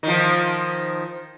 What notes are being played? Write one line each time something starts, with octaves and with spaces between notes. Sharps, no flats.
D#3 F3